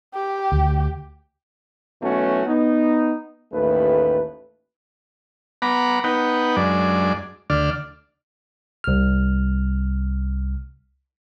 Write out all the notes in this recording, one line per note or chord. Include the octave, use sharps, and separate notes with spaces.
G4
D2
B1 B2 E3 A3 C#4 F#4
B3 D#4
A1 D#2 A3 B4
B3 F#5 A#5 B5 D6
B3 D#4 B4 F#5 G5
F#2 G#3 D4 D5
D2 D3 D5 F6
C2 F6